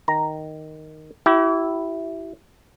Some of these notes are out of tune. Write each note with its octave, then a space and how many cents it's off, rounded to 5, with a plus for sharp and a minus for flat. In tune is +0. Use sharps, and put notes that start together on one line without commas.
D#3 +0 A#5 +0
E4 +0 G4 -40